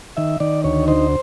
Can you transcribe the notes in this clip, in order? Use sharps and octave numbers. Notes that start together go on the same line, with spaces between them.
D#3 E5
D#3 D5
D2 C#5
D#4 C5